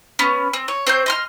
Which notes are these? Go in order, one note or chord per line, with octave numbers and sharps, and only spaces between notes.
B3 C#4
C4
C#5
C4 C5 C#5 G6
D#5 C6 F6